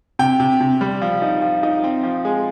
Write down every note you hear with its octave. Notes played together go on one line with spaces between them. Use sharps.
C3 G5
C3
C3
G3
F3
D#4
F3
D#4
C4
F3
G#3